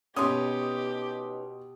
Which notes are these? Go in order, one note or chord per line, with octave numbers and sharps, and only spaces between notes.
B2 C#4 D#4 G4 B4 C6 D#6